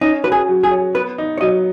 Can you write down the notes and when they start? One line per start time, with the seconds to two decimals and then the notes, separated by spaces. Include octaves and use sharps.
0.01 C#4 D#4
0.24 F#4 B4
0.32 G#4
0.48 F#3
0.63 G#4
0.71 C#5
0.95 B3 B4
1.18 D#4
1.38 C#5
1.41 F#3 D#5